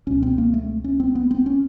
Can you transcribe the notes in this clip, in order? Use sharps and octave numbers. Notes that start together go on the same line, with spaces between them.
C#2 B2 C#4
C4
A#3
A3
C#4
C4
B3
C4
C#4